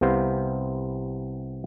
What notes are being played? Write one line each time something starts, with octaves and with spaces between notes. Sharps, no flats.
C2 C3 B3 C5 F5